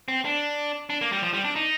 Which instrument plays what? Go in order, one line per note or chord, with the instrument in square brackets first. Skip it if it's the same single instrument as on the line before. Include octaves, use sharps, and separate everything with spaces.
[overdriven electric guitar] C4
D4
D4
A#3
G3
F3
G3
D4
D#4